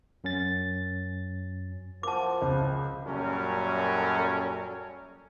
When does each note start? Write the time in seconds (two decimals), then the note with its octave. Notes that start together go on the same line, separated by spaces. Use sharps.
0.24 F#2 C#4 A6
2.03 F3 A#4 F#5 A5 D6
2.42 C#2
3.06 F#2 A#2 G3 C#4 A4 A#4